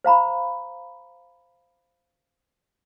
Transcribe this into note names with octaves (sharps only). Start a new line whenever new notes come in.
C5 F5 A#5 B5